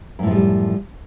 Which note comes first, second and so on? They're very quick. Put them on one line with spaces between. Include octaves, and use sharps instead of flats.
F#2 A2 F3 G#3 G3